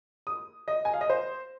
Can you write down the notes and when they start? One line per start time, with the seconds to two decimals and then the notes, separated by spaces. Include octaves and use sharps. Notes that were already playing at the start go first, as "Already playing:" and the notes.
0.27 D#6
0.68 D#5
0.85 G#5
0.93 F5
1.01 D#5
1.10 C5